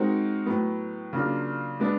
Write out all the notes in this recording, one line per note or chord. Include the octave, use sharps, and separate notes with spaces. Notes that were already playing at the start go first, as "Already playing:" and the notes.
Already playing: G#3 C4 D#4 F#4 A#4
A2 F#3 B3
C#3 F#3 A#3 D4 F4
G#3 B3 D4